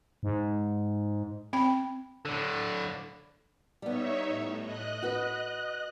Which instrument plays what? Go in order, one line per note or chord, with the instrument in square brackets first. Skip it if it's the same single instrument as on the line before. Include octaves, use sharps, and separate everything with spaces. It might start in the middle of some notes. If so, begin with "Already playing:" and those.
[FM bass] G#2
[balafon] C4 G5 B5
[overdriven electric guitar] A2 D3
[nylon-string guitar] G3 B3 [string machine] D#4 C#5 E5
[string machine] A2
D#5 F#6
[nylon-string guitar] F#4 B4